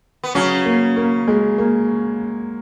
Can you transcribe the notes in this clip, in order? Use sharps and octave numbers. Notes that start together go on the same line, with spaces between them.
B3
C#3 F#3 C#4
A#3
A#3
G#3
A#3